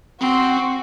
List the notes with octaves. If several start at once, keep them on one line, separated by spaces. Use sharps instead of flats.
C4 F#4